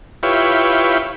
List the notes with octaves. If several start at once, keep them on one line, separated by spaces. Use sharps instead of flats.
E4 F4 G4 B4 C#5